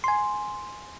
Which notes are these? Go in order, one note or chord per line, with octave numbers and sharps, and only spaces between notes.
G#5 C6